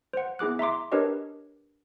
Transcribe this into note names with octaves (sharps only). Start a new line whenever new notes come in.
C5 F#5
B3 E4 G#4 D6 F#6
E5 A#5 C6 D6
D4 G4 A#4 B4 C#5 D#5